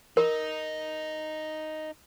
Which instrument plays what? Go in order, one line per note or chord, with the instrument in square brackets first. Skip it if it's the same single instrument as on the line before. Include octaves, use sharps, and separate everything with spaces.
[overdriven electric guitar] D#4 [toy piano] A#4